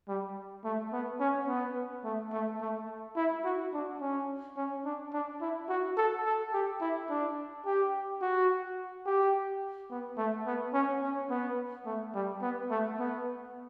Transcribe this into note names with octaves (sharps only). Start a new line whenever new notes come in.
G3
A3
B3
C#4
B3
A3
A3
A3
E4
F#4
D4
C#4
C#4
D4
D4
E4
F#4
A4
A4
G4
E4
D4
G4
F#4
G4
B3
A3
B3
C#4
C#4
B3
A3
G3
B3
A3
B3